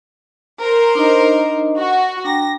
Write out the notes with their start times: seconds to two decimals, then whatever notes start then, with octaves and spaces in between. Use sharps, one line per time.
0.62 A#4 C5
0.95 D4 D#4 D#5
1.77 F#4
2.25 D4 G5 A#5 A#6